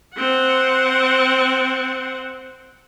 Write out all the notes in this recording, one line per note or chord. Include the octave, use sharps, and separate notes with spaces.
C4 F#5